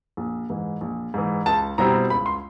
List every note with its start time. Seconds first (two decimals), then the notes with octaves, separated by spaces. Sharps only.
0.17 A#1
0.50 G#2 E3
0.81 A#1
1.14 G#2 E3
1.46 C#2 A5
1.78 B2 G3 C4 E4 A#5
2.10 C#2 B5
2.26 C6